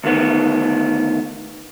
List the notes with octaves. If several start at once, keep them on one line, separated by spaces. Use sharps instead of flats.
D2 D#3 B3